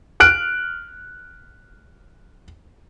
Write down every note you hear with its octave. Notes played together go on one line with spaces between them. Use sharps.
F6 F#6 D7